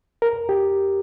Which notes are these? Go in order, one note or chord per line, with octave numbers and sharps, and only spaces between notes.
A#4
G4